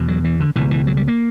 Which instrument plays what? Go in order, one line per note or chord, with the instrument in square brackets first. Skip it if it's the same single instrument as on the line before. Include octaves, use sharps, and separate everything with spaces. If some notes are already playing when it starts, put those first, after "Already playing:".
Already playing: [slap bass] E2 B2
F#3
E3
D3
C#2 B2 E3
E3
F#3
G3
A#3